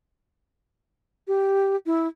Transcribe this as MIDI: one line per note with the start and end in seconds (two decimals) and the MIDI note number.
1.28 1.76 67
1.86 2.08 64